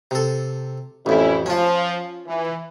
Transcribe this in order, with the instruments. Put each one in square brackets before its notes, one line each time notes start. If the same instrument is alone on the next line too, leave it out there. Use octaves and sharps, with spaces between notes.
[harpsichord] C3 A4
[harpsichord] A1 F2 [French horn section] C#4 E4
[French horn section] F3 [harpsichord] C#4 F4
[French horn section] E3